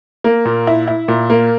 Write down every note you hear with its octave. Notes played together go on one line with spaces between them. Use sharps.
A#3
A#2
E4
E4
A#2
A#3